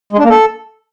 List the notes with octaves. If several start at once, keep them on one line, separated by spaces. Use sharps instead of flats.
G#3
D4
A#3
A4